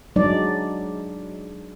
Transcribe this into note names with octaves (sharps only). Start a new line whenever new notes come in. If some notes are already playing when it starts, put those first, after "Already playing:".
F#3 G#3 D4 D#4 D5